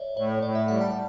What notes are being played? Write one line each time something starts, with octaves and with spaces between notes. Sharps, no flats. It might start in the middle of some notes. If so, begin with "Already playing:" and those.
Already playing: C#5 D5 E5
A2 C#5
A2 D5
E5
G3 F#5
A5